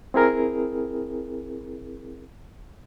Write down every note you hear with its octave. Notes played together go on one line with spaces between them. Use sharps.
C4 E4 G#4 A#4